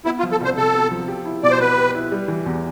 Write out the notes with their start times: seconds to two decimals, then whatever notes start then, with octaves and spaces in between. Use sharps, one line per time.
0.05 B3 E4
0.19 F4
0.23 F3
0.31 A4
0.41 C2 C5
0.57 C3 A4
0.74 B3
0.91 F3
1.08 G4
1.25 E4
1.43 B2 D5
1.51 C5
1.60 B3 B4
1.77 G4
1.95 E4
2.12 G3
2.28 E3
2.46 E2